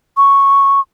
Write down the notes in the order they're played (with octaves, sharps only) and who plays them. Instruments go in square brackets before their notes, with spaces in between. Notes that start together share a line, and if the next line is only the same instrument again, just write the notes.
[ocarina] C#6